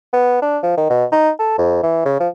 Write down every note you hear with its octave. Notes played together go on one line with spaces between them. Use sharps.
B3
D4
F3
D#3
B2
D#4
A4
F2
E3
C#3
F3